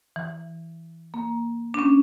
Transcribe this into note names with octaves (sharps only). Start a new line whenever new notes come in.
E3
A#3
D4
C#4